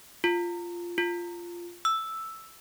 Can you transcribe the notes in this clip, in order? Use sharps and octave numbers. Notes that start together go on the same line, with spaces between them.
F4
F4
E6